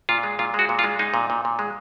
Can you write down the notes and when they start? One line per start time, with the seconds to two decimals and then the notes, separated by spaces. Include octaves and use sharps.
0.09 A#2 F4
0.23 G#3
0.39 A#2 F4
0.54 G#3 F#4
0.69 A#2
0.79 F4
0.84 G#3
0.99 G#3 D#4
1.14 A#2
1.30 A#2
1.45 A#2
1.59 G#3